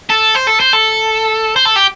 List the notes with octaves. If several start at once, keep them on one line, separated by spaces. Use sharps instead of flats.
A4
C5
A4
C5
A4
C5
A4
G4